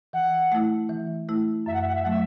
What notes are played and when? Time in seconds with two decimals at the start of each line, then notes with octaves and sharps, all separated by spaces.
0.13 E3 F#5
0.52 A3 E4
0.89 E3
1.29 A3 E4
1.66 F#2 E5
1.73 F#5
1.81 E5
1.87 F#5
1.95 E5
2.02 F#5
2.05 F#3 A3 E5